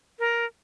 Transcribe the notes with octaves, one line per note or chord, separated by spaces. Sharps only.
A#4